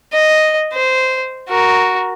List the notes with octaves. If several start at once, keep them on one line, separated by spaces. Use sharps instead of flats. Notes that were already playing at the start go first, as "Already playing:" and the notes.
D#5
C5
F#4 A#4